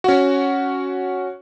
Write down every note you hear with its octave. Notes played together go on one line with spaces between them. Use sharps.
C#4 F#4